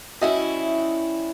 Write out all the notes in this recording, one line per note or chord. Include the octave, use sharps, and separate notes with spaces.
G3 C#4 E4 F#4 D#5 E5